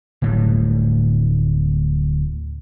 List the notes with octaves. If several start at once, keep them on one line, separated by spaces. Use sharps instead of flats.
D1 A2 G3